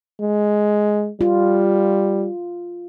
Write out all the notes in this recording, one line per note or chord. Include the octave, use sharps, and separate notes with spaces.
G#3
G3 F4